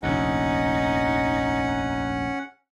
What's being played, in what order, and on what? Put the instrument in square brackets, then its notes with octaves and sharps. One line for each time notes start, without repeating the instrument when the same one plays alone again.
[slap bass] F1 A#1 D#2 [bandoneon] C#4 F#5 [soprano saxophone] D#4